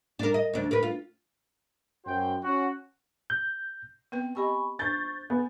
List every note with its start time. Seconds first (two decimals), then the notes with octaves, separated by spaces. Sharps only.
0.19 D4 A#4
0.34 D#5
0.53 D2 D4
0.71 A#4 B4
0.83 F4
2.05 F#2 F#4 C5 G5
2.43 C#4 F#4
3.30 G6
4.12 B3 C4 B4 G5
4.35 C4 G4 D#5 G#5 B5 C#6
4.79 D4 C5 C#6 G6 A6
5.30 B3 G#5